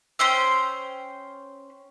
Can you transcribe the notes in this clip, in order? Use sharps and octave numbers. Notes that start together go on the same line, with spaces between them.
C#4 C5 G5 E6